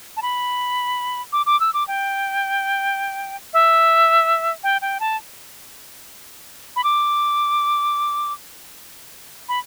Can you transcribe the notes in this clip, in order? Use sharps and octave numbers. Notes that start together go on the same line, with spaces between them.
A5
B5
D6
D6
E6
D6
G5
E5
G5
G5
A5
B5
D6
B5